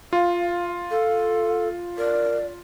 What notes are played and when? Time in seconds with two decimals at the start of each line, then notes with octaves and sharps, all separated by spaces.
0.13 F4 F5
0.91 A4 F5
1.98 A#4 D5